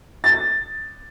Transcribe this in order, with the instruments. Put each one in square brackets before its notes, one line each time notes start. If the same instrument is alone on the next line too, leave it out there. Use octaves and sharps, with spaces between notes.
[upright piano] A6